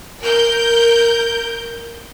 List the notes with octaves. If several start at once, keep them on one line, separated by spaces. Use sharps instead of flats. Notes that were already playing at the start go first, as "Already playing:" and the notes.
A#4 G6